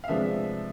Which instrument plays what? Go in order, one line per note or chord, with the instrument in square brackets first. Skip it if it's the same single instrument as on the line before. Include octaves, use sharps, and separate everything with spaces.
[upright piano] F5
C3 F3 G#3 B3 D4 E5